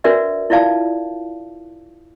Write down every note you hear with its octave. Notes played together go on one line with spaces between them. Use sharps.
D4 F#4 A#4 B4 D5 E5
E4 F4 D5 F5 A5